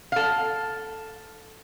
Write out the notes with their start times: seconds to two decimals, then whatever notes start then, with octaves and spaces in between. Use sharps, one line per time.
0.12 A4 F5